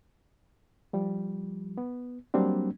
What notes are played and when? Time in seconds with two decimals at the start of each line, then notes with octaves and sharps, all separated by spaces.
0.93 F3 G3
1.78 B3
2.34 F#3 G3 A#3 C4 D4